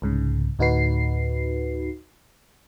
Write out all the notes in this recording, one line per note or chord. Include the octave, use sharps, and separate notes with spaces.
C2 G#2 C#3
D2 A2 D#4 F#4 B4 C7